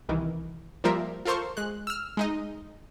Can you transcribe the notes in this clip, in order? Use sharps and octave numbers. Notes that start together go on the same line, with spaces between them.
C2 D#3 E3
F3 G3 A#3 F4 A#4 E5
F4 A4 A#4 C5 C6 C#6
G#3 F#6
E6 F6
G#3 D#4 D#5